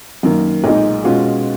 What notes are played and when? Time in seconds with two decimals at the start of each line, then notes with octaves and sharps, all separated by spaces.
0.23 F#2 D#3 A#3
0.64 B1 A#2 G#3 D#4
1.04 B2 G#3 C#4 F4